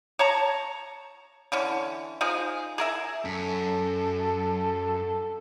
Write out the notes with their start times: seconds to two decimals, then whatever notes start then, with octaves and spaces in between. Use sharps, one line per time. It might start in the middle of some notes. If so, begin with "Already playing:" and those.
0.19 C#5 A5 A#5
1.52 D3 E3 C#4
2.21 F3 G#3 D#4 G#4
2.78 G#4 A#4 E5
3.25 F#2 A4